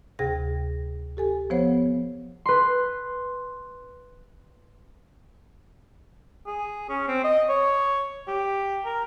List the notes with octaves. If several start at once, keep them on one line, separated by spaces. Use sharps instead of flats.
D2 C3 G#4 G5 A#6
G4 A4 G#5
F3 B3 C5 C#5 F#5
B4 C6
G#4
C#4
C4
D#5
C#5
G4
A#4